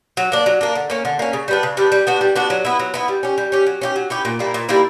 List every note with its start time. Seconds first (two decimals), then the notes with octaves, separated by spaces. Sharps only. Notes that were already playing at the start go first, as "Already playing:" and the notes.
0.17 F#3
0.32 A#3 D4
0.46 F#3
0.61 A#3 D4
0.75 D3
0.90 A#3 C#4
1.05 D3
1.19 A#3 C#4
1.33 C#3
1.48 G3 B3 D4
1.63 C#3
1.77 G3 B3 D4
1.92 G3
2.07 B3 D4 F#4
2.21 G3
2.36 B3 D4 F#4
2.50 F#3
2.65 B3 E4
2.79 F#3
2.94 B3 E4
3.08 G3
3.23 C#4 G4
3.38 G3
3.52 C#4 G4
3.66 F#3
3.81 C#4 E4 G4
3.96 F#3
4.10 C#4 E4 G4
4.25 A#2
4.39 G3 A#3 E4
4.54 A#2
4.69 G3 A#3 E4